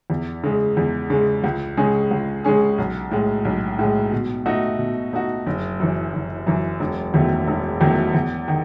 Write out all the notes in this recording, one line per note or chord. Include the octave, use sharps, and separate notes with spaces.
E2
C#3 G#3
E2
C#3 G#3
C#2
C#3 G#3 C#4 G#4
C#2
C#3 G#3 C#4 G#4
B1
A2 G#3
B1
A2 G#3
B2
A3 D#4 F#4
B2
A3 D#4 F#4
F#1
F#2 E3
F#1
F#2 E3
E1
E2 D#3 F#3 A3
E1
E2 D#3 F#3 A3
E2
D#3